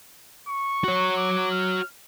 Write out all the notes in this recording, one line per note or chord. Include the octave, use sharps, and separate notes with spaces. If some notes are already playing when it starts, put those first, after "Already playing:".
C#6
F#4 C#5
D6
F6